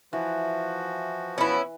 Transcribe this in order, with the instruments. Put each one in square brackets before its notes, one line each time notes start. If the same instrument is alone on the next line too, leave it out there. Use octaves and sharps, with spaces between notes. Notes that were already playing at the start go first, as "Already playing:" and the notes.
[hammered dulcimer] E3 [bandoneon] F3 F#4
[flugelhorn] B3 [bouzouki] C#4 E4